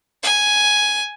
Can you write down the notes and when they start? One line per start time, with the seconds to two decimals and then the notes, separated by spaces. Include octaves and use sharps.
0.23 G#5